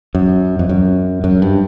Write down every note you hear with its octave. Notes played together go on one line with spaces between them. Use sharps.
F#2
F2
F#2
F#2
G2